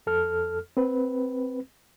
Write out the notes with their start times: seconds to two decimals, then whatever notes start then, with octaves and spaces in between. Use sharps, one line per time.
0.07 F2 A4 F6
0.77 C4 B4